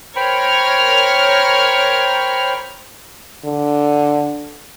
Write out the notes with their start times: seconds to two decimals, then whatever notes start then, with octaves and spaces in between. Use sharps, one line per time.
0.16 A#4 C5 C#5 G5 B5 F6
3.45 D3